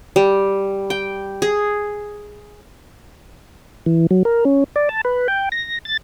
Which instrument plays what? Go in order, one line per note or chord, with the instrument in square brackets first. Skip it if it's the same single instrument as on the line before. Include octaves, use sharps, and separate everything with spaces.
[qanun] G3
G5
G#4
[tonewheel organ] E3
F#3
A#4
C#4
D5
A5
B4
G5
A#6
A6